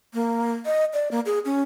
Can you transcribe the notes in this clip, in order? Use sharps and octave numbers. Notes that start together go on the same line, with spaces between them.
A#3
D#5
D5
A#3
G#4
C#4